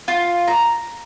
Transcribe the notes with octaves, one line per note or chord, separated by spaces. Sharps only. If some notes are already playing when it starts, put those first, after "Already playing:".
F4
A#5